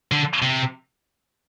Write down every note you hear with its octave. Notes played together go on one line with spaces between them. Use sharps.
D3
C3